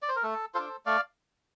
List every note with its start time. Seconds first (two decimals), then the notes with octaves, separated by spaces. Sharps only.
0.02 D5
0.09 C5
0.16 A#4
0.23 A3 A4
0.54 D4 F4 A4 C5
0.86 A3 D5 F5